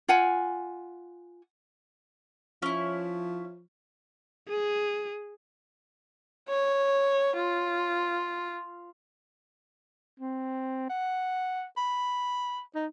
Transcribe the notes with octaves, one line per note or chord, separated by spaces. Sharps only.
F4 F#5 G#5
F3 C#4 E4
G#4
C#5
F4
C4
F#5
B5
D#4